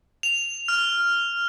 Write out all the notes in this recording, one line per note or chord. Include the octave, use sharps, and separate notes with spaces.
F7
F6